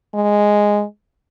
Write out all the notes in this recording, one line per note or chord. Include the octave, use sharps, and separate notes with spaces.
G#3